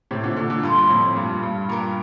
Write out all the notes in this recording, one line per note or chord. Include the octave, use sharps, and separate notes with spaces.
A2 C3
A#2 D3
A#2 D3
A#2 D3
G2 A#2 F4 A4 C5 G5
F2 A2
G2 A#2
G2
G2 A#2 D4 G4 A#4